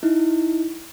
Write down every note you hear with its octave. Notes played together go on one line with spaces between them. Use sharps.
D#4 E4